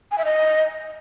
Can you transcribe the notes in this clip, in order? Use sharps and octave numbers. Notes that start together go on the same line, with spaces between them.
G#5
E5
D#5